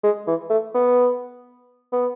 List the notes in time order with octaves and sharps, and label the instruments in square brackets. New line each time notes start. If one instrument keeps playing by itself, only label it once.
[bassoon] G#3
E3
A3
B3
B3